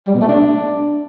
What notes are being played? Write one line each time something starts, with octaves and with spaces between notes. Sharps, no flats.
G3
B2
A3
D4